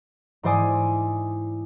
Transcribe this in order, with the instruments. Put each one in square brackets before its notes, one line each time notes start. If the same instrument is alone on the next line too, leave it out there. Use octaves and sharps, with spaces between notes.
[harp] G#2 E3 C5 D5 G#5 D#6